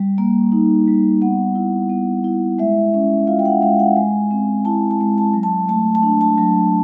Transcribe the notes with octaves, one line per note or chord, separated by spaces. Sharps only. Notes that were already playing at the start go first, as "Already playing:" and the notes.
Already playing: G3
A#3
D#4
G3
B3 F#5
E4
B3
E4
G#3 E5
C#4
F4 F5
G5
F#5
G#3 F5
F#5
G#3 G#5
C4
E4 A5
A5
G#3
A5
F#3
A5
A3 A5
A5
D4
A5
F#3